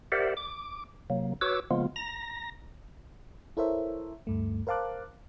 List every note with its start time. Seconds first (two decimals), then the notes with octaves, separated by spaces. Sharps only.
0.12 G4 A#4 C5 D5 E5 F#5
0.37 D6
1.10 C3 F#3 A#3
1.41 F#4 B4 C#5 D6 E6
1.71 C#3 F3 G#3 A#3 B3 F4
1.96 A#5 A#6
3.57 E4 A4 A#4 C5 C#5 E5
4.27 D2 G2 A3
4.67 A#4 C5 F5 A5 D6 F#6